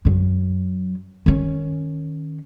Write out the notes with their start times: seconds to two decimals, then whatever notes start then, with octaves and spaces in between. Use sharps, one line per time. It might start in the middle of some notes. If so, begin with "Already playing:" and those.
0.05 F#2 F#3
1.26 D#3 C#4